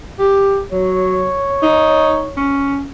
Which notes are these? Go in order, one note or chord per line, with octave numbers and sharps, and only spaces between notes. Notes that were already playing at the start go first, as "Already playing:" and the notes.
G4
F#3 C#5
D#4
C#4